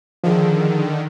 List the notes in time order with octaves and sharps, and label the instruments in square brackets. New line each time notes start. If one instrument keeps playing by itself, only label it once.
[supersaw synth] D3 D#3 [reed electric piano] F3 G#4